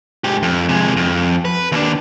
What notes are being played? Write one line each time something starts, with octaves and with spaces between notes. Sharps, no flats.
G#2 G4
F2
C3 G#3
F2
B4
D#2 D4